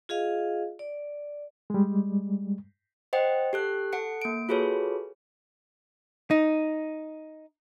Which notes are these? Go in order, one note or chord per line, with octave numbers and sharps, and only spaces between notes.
F4 G#4 D#5 F5
D5
G3 G#3
C5 D#5 F#5 G5
G4 A4 F#6
A4 F#5 C#7
A#3 D7
F4 F#4 G#4 A4 B4 C#5
D#4